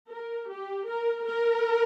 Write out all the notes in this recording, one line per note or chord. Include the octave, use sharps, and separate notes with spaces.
A#4
G4
A#4
A#4